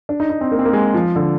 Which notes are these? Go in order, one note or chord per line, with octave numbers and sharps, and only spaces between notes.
D4
D#4
D#4
C4
A#3
C4
A#3
G#3
F3
D3